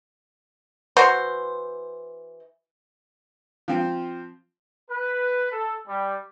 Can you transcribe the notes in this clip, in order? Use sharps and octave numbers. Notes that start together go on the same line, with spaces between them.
E3 F#4 C5
F3 C4
B4
A4
G3